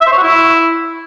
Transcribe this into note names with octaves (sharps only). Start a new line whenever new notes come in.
E5
C5
C#5
F#4
E4